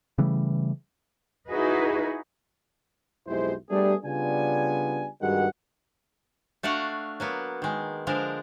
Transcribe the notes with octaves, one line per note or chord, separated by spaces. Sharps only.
C#3 E3 G3 A3
D#4 E4 F#4 G#4 B4 D#5
B1 F2 G#3 E4 G4 C5
G3 A3 B3 D4 G4 G#4
C#3 G3 B3 D4 F4 G#5
G2 D#3 G3 G#3 F#4 F#5
A3 D4 F#4 F5 F#5
F#3 A#3 B3
D#3 G#3
D3 F3 G#3 D4 A#4